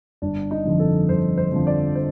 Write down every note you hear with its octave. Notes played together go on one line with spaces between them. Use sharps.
G1 D4
D#4
F2 D3 F3
A4
G1 C5
C5
F2 D3 F3
D5
C5